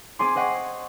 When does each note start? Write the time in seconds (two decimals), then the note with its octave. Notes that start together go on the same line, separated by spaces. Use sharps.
0.19 C4 G#4 D5 G#5 C6
0.35 C5 D#5 F#5 G5 C#6 C7